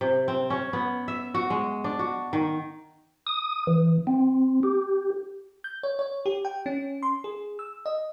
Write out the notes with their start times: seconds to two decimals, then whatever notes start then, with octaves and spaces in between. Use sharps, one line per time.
0.01 C3
0.28 C4
0.50 C#4
0.73 B3
1.08 E5
1.34 F#4
1.50 G#3
1.84 D4
1.99 F#4
2.33 D#3
3.27 D#6
3.67 E3
4.07 C4
4.63 G4
5.64 G6
5.83 C#5
5.99 C#5
6.26 G4
6.45 G5
6.66 C#4
7.03 C6
7.24 G#4
7.59 E6
7.86 D#5